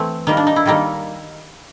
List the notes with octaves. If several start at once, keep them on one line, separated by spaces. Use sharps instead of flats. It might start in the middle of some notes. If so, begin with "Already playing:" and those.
Already playing: E3 A3 C4
D#3 G3 A#3 D#4
D4
D#4
E4
D#3 G3 A#3 D#4